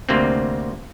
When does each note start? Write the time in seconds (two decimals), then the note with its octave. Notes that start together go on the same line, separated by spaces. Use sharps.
0.09 D2 C3 A#3 C4